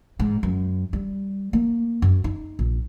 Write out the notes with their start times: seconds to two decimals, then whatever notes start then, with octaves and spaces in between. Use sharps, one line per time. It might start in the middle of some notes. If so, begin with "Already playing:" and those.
0.20 G#2
0.43 F#2
0.93 G3
1.53 A#3
2.02 F#2
2.24 D#4
2.59 A#1